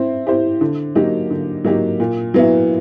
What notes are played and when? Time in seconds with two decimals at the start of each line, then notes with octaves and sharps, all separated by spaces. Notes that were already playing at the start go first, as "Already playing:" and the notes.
Already playing: C4 E4
0.27 E4 G4 C5
0.61 D3
0.95 F#3 A#3 D#4 G4
1.30 D3
1.65 F#3 A#3 D#4 G4
2.00 A#2
2.34 F#3 B3 E4